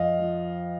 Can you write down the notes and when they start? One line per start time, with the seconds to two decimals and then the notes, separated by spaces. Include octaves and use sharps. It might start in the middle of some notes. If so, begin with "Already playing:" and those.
Already playing: F2 D#5 F5
0.19 F3